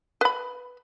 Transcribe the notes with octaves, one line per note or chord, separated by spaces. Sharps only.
B4 B5